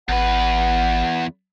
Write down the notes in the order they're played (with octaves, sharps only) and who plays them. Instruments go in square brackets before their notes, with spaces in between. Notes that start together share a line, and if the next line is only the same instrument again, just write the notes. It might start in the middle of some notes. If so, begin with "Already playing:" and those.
[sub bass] G#1 [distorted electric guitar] E2 B4 [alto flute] F#5